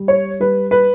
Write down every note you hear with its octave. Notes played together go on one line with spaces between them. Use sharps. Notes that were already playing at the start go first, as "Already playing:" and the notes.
Already playing: G3
C#5
G3 B4
B4